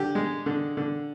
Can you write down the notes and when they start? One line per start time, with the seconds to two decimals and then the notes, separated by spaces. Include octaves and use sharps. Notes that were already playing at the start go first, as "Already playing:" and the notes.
Already playing: D3 G4
0.15 G#3
0.46 D3
0.77 D3